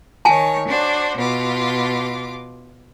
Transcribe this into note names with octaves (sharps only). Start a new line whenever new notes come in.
D#3 C#5 G#5 A5
D4 F#4 C5
B2 F4 D6